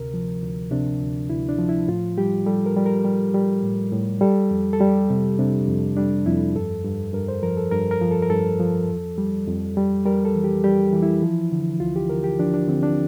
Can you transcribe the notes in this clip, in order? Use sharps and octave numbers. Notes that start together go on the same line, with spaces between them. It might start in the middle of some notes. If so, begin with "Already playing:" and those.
Already playing: D2 C3 A#4
F3
D2
C3 D4
D2
D2 E4
D4
F3
E4
A2 F4
G3 G4
G3 A4
A#4
G3
A#4
G3
G3
A2
A2
G3 A4
F2
A4
G3 G4
C3
C3 D4
F2
G3 D4
F2 E4
G2 A4
G2
G2 A#4
C5
F3 A#4
A4
G2 A#4
A#4
F3
A4
A#4
G2 A4
F3
F2
G3
F2
G3
G3 A#4
A4
E3
G4
G3 G4
E3
E4
F3
D3
D2 F4
G4
D3 A#4
G4
F3 D4
D4
D3 C4
D4